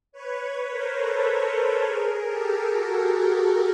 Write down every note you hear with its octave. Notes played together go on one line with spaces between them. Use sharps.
B4 C#5
B4 C#5
A#4 C5
A4 B4
A4 B4
G#4 A#4
G4 A4
F#4 G#4